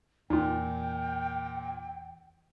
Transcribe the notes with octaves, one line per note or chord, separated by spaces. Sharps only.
E2 A#2 D#4 F4 G5